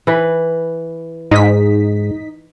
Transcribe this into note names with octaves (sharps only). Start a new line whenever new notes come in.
E3 B4
G#2 D#4 D#5 B6